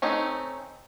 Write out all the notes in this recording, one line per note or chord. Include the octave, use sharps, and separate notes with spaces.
A3 C4 C#4 D#4